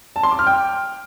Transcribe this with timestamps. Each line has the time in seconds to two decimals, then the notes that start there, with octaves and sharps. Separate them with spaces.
0.16 A5
0.23 C6
0.31 D6
0.39 F6
0.47 G5